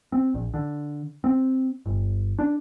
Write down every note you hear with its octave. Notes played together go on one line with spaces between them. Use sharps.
C4
A#1
D3
C4
G1
D4